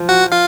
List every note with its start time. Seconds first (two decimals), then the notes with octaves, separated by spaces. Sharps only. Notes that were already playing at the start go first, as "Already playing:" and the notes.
Already playing: F3
0.09 F#4 F#5
0.32 F4 F5